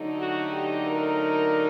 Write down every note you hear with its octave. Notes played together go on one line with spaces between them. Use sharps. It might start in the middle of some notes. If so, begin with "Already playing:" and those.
Already playing: D3 F#3 A3 D#4
F#4
G4
A#4